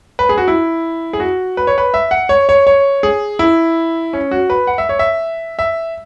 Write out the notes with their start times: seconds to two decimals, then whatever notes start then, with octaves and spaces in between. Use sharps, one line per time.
0.19 B4
0.29 G#4
0.38 F#4
0.48 E4
1.13 G#4
1.20 F#4
1.57 B4
1.67 C#5
1.78 B4
1.94 E5
2.11 F#5
2.29 C#5
2.49 C#5
2.67 C#5
3.03 G#4
3.39 E4
4.13 C#4
4.31 F#4
4.50 B4
4.67 F#5
4.78 E5
4.89 C#5
4.99 E5
5.59 E5